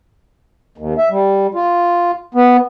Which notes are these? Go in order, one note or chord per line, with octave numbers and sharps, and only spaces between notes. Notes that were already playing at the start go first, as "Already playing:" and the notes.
D#2
E5
G3
F4
B3